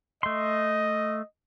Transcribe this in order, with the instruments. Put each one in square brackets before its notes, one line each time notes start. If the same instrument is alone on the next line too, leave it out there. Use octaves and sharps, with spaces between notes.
[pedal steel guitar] A3 C6 [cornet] D#5